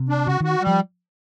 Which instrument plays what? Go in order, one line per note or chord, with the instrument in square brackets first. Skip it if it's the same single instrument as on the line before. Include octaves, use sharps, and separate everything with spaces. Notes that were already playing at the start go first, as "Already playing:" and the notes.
Already playing: [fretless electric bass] C3
[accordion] D4
[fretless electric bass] C#3 [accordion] F#4
[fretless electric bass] D#3 [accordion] F#4
[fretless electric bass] F3 [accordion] G3